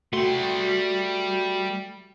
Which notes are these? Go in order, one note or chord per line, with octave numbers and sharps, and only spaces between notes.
G3 A3 F#4 G5 C6